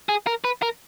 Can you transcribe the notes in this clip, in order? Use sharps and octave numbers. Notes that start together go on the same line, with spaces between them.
G#4
A#4
B4
A#4